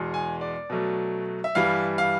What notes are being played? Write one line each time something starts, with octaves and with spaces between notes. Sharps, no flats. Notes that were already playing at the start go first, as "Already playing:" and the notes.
Already playing: E2 B2 G#3
G#5
D5
B2 F#3 A3
E5
G2 E3 G3 F5
F5